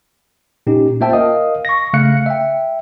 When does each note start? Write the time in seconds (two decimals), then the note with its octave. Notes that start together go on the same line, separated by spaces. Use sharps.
0.67 A#2 C#4 D#4 G4
1.01 A#3 F4 C5 E5 G5 A5
1.13 A#4 D#5 F5 D#6
1.65 C#6 A#6
1.93 C#3 A3 F5 F#6 C#7
2.26 E5 G5